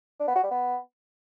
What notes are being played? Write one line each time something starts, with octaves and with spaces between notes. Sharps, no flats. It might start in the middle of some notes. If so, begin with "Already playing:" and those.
D4
B3
F#4
G3
B3